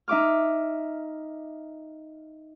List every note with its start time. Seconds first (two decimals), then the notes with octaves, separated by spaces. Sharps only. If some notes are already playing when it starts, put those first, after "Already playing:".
0.08 D#4 E5 D6 F6